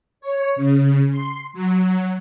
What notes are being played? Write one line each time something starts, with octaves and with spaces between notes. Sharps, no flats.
C#5
C#3
C6
F#3